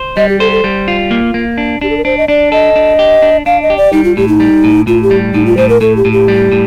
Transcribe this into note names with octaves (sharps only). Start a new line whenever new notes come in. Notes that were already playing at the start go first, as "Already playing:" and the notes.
Already playing: C5
G3 D#5
G4
A4 C5
A4
G3
F4
A#3
A#3
D4
D4 G4
A4
A#4
D4 C5
D#5
D4 D5
A4 D#5
D4
G4
D4
D4 F5
D#5
G4
D5
G3 D#4
F4
A2 G4
D#4
G3
A2
A2 F4
G4
G3
A2 D#4
F4
A2 C5
A#4
A2 A4
G4
A2
G4
G3
A2